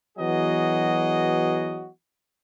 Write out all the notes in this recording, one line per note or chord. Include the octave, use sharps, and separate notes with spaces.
E3 F#3 B3 F#4 G#4 D#5